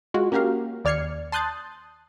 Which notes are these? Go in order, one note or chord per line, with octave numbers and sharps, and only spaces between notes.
G#3 F4 F#4
A#3 C#4 F#4 G4 A#4 F5
D#2 D5 F6 G#6 C7 C#7
A5 C6 D#6 F#6 G6 A6